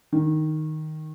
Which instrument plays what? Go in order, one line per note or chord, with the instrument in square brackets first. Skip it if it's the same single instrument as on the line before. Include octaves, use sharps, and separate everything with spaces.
[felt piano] D#3